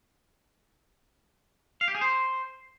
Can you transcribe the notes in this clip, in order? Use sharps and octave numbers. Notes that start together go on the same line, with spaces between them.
F5
G4
G#4
C5